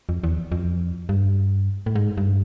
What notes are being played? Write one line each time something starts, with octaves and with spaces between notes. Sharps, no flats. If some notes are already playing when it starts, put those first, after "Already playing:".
F2
E2
F2
G2
A2
G#2
G2